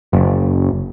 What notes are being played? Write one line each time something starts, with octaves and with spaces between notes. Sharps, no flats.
F#1